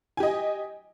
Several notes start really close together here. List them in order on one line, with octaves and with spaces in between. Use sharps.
G#5 G4 D#5